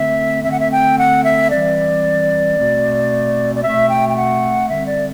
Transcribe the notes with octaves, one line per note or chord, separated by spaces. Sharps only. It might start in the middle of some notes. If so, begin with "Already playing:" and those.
Already playing: D3 A3 C4 E5
D3 A3 C4 E5
F#5
E5
G5
F#5
E5
E3 G3 C4 D5
B2 A3 C4
D5
B2 A3 C4 E5
G5
G5
F#5
D3 G3 C4 E5
D5